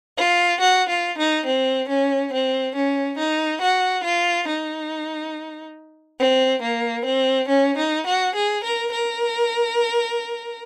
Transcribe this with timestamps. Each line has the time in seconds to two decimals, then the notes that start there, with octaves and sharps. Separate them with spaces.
0.17 F4
0.59 F#4
0.88 F4
1.17 D#4
1.45 C4
1.88 C#4
2.32 C4
2.74 C#4
3.17 D#4
3.61 F#4
4.03 F4
4.47 D#4
6.19 C4
6.62 A#3
7.05 C4
7.48 C#4
7.77 D#4
8.05 F#4
8.34 G#4
8.62 A#4
8.91 A#4